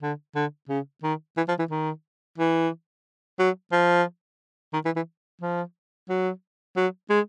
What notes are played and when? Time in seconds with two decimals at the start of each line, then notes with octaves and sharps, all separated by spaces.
0.02 D3
0.35 D3
0.69 C#3
1.03 D#3
1.37 E3
1.48 F3
1.59 E3
1.70 D#3
2.38 E3
3.39 F#3
3.72 F3
4.73 D#3
4.85 E3
4.96 E3
5.41 F3
6.09 F#3
6.76 F#3
7.10 G#3